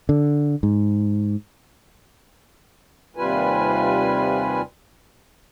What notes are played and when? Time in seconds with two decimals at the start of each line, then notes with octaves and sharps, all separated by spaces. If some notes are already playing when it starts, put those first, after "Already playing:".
0.09 D3
0.63 G#2
3.16 D#2 C3 G3 F4 B4 G#5